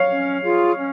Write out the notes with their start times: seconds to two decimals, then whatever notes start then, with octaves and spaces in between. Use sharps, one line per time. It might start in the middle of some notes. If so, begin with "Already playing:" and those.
Already playing: C#5 F5
0.10 C#4
0.43 F4 G#4
0.77 C#4